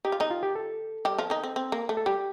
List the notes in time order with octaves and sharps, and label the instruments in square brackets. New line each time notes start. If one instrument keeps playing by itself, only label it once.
[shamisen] D#4 [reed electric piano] G4
[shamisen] F4
D#3 D#4
[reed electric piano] F4
G4
A4
[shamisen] G3 G4
F3 F4
D#3 D#4
C4
C4
A#3
A3
[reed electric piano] A4
[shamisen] G3 [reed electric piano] G4